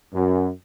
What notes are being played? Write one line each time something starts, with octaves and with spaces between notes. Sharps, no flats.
F#2